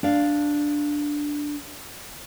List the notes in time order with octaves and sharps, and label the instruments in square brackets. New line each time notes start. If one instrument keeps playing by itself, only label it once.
[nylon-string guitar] D4 F5